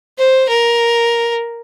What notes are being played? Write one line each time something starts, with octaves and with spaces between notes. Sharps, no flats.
C5
A#4